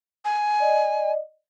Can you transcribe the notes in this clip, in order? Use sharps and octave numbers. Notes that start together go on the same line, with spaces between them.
G#5
D5 D#5